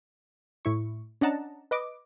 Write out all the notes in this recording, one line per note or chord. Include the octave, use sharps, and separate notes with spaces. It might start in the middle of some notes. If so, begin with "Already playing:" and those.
A2 E4 C#6
C#4 D4 D#5 F#5 A5 A#5
B4 D#5 D6